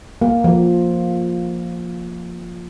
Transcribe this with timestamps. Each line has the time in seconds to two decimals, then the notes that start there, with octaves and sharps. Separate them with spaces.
0.22 A#3
0.44 F3